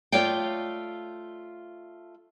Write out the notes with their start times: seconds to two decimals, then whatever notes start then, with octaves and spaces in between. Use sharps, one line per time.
0.12 A3 F4 C#5 D5 F5 G5